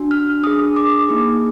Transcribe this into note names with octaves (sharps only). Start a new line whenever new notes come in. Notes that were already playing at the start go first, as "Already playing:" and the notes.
Already playing: D4 F#4
F6
D4 G#4 D#6
D6
A#3 D#4 G#4